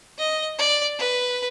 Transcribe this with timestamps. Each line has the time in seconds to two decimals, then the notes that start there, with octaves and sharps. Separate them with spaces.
0.18 D#5
0.58 D5
0.99 B4